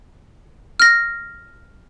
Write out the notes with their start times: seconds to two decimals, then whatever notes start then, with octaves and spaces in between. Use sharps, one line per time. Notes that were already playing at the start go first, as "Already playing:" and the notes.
0.80 F6 A#6